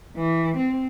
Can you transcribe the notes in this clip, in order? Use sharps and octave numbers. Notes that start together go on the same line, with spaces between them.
E3
C4